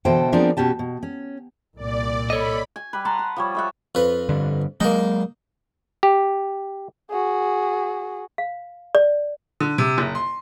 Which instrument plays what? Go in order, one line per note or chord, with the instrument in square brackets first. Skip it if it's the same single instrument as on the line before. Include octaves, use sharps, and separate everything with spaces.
[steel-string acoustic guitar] B2 D3 E3 A4 C5 G5
F3 B3 C4 D4 G#4 A#4
B2 C#4 G4 A5
B2
C#4
[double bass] C2 A#2 [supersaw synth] D5
[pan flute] A4 [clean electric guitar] C#5 D#5 [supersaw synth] B5
[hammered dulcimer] G#5
G3 B4
F#5 A5 A#5 C6
B4
F3 G3 C#5
A4 E5 F#5
[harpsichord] F2 B4
[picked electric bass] G2 D3
[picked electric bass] F#3 G#3 [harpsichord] A#3 D#4
[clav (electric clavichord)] G4
[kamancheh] F#4 G#4
[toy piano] F5
D5
[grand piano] D3
C3
F#1
C6